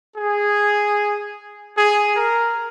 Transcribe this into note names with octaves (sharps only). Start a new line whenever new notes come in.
G#4
G#4
A#4